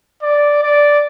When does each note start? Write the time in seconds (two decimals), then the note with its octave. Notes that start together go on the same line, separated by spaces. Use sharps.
0.23 D5
0.63 D5